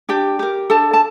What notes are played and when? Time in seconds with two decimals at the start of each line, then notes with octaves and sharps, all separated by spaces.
0.09 D4 G4 G5
0.39 G4 A#4
0.70 D4 A4 A5
0.93 A5